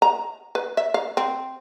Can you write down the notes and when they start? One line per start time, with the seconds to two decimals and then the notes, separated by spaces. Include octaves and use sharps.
0.02 A#5
0.55 B4
0.77 E5
0.94 F5
1.17 C4